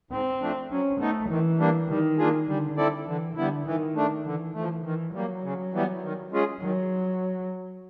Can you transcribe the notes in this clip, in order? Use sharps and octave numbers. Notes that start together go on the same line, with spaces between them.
G#2 C4
F3 A3 D4
F#3 C#4
A3 B3 D#4
D#3 E3
G3 A#3 D4
D#3 G3
A#3 D4 F4 G#4
D3 G3
C4 E4 A4 D5
D3 E3
D3 G3 B3 E4
D#3 E3
A3 D4
D3 E3
E3 F3 A3
D#3 E3
F#3 G3 A#3
C#3
E3 G3 B3
D#3
G#3 C#4 F4 G#4
D#3 F#3